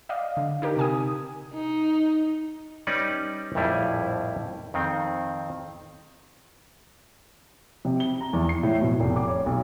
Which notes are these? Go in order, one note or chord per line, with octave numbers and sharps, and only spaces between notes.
D5 D#5 F5
D3
D#4 G4 A#4
C3 G#5 D#6
D#4
G3 C#4 D#4 B4 D5
A#1 F2 A2 G3 E4 G#4
F2 D#3 C4
C3
G7
A#5
E2
C7
A2
B2
F1
D6
C#5
B1